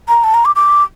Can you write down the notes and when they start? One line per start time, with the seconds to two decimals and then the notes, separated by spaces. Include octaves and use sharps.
0.08 A#5
0.24 A5
0.34 A#5
0.45 D6
0.56 D6